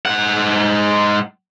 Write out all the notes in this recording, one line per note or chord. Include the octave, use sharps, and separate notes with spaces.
G#2 F#5